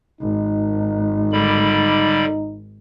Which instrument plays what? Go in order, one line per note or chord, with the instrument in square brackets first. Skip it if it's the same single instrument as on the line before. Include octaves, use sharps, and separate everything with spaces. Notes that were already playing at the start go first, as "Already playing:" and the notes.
[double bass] G#1 [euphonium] D#4
[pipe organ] D3 G3 B5